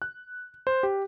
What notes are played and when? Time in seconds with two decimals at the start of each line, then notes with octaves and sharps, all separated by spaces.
0.02 F#6
0.67 C5
0.83 G4